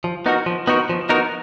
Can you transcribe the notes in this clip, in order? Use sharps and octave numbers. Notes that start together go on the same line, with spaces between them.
F3
B3 D#4 F#4 A#4
F3
B3 D#4 F#4 A#4
F3
B3 D#4 F#4 A#4